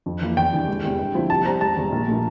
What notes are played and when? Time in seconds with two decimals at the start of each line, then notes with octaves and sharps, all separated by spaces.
0.06 F2
0.21 E3 A#3 E4
0.37 E2 G5
0.52 C3 E3 G3 D4
0.68 E1
0.83 E2 C3
0.98 G2
1.15 D3 F3 C4 E4
1.30 C3 A5
1.45 G3 C4 A#5
1.61 E1 A5
1.77 E2 C3 G3
1.92 A#1
2.08 A#2 A3